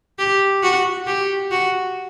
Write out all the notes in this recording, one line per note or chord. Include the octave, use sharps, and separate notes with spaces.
G4
F#4
G4
F#4